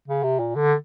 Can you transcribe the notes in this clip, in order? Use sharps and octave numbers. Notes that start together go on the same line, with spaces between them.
C#3
C3
A#2
D3